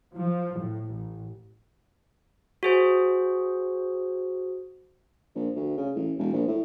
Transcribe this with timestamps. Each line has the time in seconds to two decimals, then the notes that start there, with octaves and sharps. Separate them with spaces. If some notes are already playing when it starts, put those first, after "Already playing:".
0.17 F3
0.58 A2
0.92 A1
2.63 F#4 G#4 C5
5.35 A#1
5.56 D2
5.77 C#3
5.95 A1
6.19 E1
6.33 A#1
6.47 A2